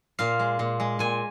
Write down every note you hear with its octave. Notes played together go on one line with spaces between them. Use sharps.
A#2 F5
G#3
A#2
G#3
A#2 G#5